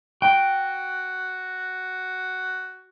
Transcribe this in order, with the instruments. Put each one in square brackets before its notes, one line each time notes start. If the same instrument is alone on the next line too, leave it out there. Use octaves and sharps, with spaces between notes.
[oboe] F#4 [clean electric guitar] G5